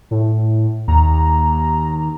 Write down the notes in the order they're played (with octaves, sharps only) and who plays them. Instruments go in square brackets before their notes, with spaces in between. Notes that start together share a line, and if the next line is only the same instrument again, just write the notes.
[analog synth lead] A2
[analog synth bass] D#2 [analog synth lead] A#5